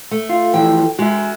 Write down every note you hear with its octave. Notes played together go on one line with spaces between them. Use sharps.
A3
F4
E3 F3 A3 G5
G#3 F#4 E5